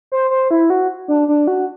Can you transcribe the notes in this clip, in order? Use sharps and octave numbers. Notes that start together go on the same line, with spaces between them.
C5
C5
E4
F#4
D4
D4
F#4